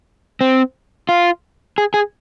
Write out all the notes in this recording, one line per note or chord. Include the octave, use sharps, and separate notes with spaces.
C4
F4
G#4
G#4